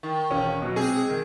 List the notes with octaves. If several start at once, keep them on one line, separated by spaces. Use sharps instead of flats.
D#3
E1 C#4
B2 F#3
C3 G#3 G#4
D#3